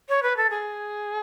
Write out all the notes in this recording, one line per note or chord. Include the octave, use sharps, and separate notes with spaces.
C#5
B4
A4
G#4